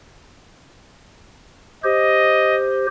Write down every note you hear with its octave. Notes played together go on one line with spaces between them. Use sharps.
G4 C5 D#5